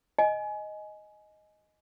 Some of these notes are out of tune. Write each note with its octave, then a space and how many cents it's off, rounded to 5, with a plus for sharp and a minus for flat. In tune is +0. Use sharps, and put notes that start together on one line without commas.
D#5 +0 G#5 +20